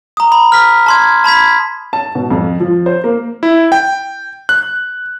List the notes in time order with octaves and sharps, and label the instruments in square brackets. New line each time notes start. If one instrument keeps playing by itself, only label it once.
[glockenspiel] A#5 D#6
B5
F6 B6
A5 C6 G#6
A5 B5 G#6 B6
[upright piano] A5
B2
F2
F3
C5
A#3
[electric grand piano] E4
G5
F#6